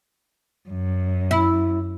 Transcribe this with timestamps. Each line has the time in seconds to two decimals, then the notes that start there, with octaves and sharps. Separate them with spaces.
0.69 F#2
1.31 E4